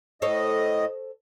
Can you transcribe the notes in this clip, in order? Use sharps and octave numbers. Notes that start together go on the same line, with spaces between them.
A2 A4 C5 C#5 D#5